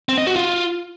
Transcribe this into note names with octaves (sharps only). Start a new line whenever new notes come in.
C4
D#5
F#4
F4